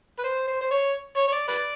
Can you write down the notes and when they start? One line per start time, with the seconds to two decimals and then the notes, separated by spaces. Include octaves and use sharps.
0.18 B4
0.24 C5
0.48 C5
0.61 C5
0.71 C#5
1.16 C#5
1.28 C#5
1.32 D5
1.48 B4 D5